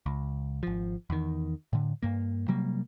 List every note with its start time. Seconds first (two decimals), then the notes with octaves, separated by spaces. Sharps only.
0.06 C#2
0.63 G#1 F3
1.10 E2 D#3
1.73 A2 D3
2.03 G2 A#3
2.48 C3 F#3 G3 A#3